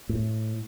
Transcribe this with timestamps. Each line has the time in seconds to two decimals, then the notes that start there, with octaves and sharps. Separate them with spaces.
0.09 A2